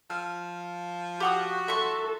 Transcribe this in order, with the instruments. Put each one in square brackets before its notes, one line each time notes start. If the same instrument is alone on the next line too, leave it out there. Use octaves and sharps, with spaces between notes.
[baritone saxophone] F3 [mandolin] F6
[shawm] F#4 [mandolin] G4 F#5 D#6
[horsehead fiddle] A4 [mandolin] E5 C6 C#6